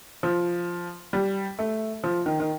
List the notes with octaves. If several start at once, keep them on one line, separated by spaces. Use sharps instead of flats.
F3
G3
A3
F3
D#3
D#3